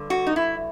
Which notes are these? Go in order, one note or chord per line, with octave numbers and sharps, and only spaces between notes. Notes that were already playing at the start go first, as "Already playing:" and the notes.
Already playing: G2 D3
F#4
D#4
E4